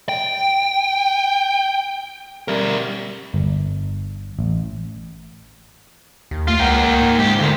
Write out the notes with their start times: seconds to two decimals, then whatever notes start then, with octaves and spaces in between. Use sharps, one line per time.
0.09 G5
2.48 G3 A#4
3.34 G1
4.39 A1
6.31 D#2
6.48 A3 F4
6.59 C#2 A#3 F#5 G5
7.01 G#2
7.18 C#2 G#3 G4
7.39 D2 A#2 D3